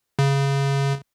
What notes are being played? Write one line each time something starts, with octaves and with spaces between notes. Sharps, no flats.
C#3